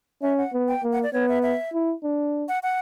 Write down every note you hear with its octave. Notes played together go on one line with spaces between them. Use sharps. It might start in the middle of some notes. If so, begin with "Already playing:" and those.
C#4 E5
F#5
B3
G5
A#3
F#5
D5
B3 C#5
E5
E5
E4
D4
F#5
F#5